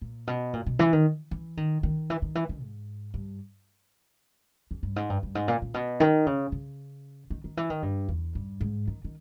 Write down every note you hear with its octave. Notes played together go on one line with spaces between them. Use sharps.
A#2
B2
A#2
B2
E3
D#3
E3
D#3
D#3
E3
D#3
E3
D#3
G#2
G2
E2
G2
G#2
G2
G2
G#2
A#2
A#2
B2
D#3
C#3
C#3
D#3
D#3
E3
D#3
G2
E2
G2
G#2
D#3
D#3